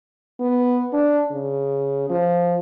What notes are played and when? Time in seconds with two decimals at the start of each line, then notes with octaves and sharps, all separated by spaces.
0.40 B3
0.93 D4
1.31 C#3
2.10 F3